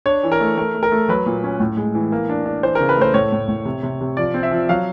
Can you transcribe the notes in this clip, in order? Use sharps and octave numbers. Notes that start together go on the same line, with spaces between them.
D4 C#5
E3
A#4
A3
A3 A#4
A3
A#4
A3
F#3 B4
A#2
C#4
A2
G#3
E3
A#3
D4
D4
E3 C5
A#4
C#3
B4
A3 C5
A2 C#5
A2
A2
C3
C3
C3
F3 D5
C4
E5
F3
F#3 F5